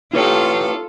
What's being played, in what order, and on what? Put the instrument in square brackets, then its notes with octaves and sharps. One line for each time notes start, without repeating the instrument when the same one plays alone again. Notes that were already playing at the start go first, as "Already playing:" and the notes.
[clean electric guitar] E4 B4 C#5 [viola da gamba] F4 A4